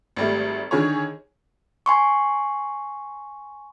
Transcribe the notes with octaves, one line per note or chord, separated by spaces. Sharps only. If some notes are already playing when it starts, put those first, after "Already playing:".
G#1 G3 A3
D3 D#3 G#4 C#5
G#5 C6 C#6